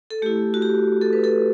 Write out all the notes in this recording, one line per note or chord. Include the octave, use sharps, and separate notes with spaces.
A4
A3 E4 G4
F#4
G4
A4
B4
A4